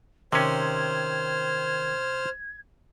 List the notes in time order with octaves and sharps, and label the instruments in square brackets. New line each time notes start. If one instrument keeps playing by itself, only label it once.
[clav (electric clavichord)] C3 C#4 [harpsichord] D#3 [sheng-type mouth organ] C5 F6 [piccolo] G#6